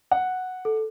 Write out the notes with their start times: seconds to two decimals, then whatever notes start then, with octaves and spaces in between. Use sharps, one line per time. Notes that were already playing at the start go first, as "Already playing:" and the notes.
0.11 F#5
0.65 A4